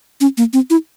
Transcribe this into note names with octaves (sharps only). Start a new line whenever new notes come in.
C#4
A#3
C4
E4